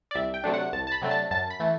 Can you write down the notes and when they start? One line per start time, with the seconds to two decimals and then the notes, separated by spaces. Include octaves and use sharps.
0.11 D5
0.15 C2 E5
0.34 G5
0.44 C3 F#3 A3 D4
0.54 F#5
0.72 C2 A5
0.87 A5
0.92 B5
1.02 C3 F#3 A3 D4
1.11 A5
1.31 F#2 A5
1.50 B5
1.60 E3 A3